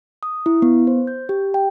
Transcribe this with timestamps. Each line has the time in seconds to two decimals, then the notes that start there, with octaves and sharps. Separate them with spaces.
0.23 D#6
0.46 E4
0.62 B3
0.87 C5
1.07 G6
1.29 G4
1.54 G5